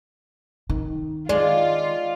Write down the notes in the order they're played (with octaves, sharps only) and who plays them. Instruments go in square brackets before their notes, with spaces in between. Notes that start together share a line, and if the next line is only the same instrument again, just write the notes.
[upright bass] D#3
[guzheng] G#3 [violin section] F4 [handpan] D5